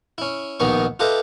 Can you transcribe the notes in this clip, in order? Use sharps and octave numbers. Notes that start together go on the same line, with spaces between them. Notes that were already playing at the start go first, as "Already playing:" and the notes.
C#4 E4
A#1 D#2 D#3 B3 D#4 C#6
F4 G4 A4 B4 D#5 E5